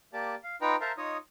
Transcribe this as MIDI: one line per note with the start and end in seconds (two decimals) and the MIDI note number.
0.13 0.35 58
0.13 0.35 67
0.13 0.35 74
0.13 0.35 81
0.44 0.56 77
0.62 0.76 63
0.62 0.76 65
0.62 0.76 71
0.62 0.76 79
0.62 0.76 82
0.81 0.92 70
0.81 0.92 72
0.81 0.92 76
0.81 0.92 77
0.81 0.92 81
0.81 0.92 82
0.98 1.17 63
0.98 1.17 65
0.98 1.17 73
0.98 1.17 75
0.98 1.17 87